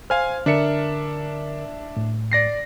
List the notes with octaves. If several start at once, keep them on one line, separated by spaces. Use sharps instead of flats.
C5 F5 G#5 F6
D3 D4 A#4 E5 C#7
A2
D5 A#6 C7